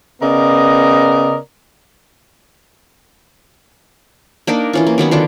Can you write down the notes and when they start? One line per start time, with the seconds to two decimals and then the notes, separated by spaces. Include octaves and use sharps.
0.22 C#3 B3 A#4 D5 D#5
4.47 A#3 D4 D#4 A#4
4.73 E3 C#4 F4
4.87 A#3
4.98 D#3 F#3 B3 C#4
5.11 D3 D#3 D4 F4